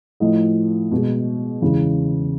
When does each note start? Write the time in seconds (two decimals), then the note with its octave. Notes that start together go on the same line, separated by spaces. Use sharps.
0.20 A2 F3 A3 D#5
0.92 B2 G#3
1.62 E2 C#3 E3 G#3